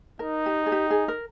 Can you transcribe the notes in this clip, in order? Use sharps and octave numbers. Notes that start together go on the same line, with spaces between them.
D#4 A#4
G4
G#4
G4
G#4
A#4